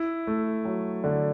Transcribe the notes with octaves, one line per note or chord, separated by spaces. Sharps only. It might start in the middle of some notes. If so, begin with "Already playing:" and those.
Already playing: E4
A3
F#3
D3